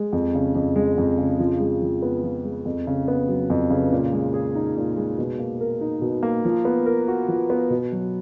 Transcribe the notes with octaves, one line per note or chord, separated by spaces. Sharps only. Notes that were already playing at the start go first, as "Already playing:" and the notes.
Already playing: G#3
F2
C#3
F2
G#3
F2
C#3
F3
G#3
F3
B3
F3
G#3
F2
C#3
B3
F#3
F2
C#3
A#2
G#3
G#4
D#4
A#2
G#3
B2
A#3
A#4
D#4
B2
A#3
F3
B3
A#4
F#4
F3
B3
B2
F#3